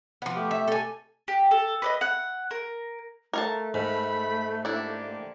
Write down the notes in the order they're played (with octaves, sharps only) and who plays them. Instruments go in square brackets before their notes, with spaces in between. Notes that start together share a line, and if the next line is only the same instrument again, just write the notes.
[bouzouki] F3 B3
[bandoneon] A3 G4
[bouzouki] E5
A4 G#5
[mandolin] G4
A4
B4 D5 D#5
F#5
A#4
[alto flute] A3 [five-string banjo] A#4 F5 A5
[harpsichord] G#2 [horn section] B5
[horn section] D3 A#3 G4 [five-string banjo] D4 E4